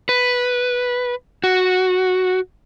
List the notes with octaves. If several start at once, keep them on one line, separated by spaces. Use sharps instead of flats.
B4
F#4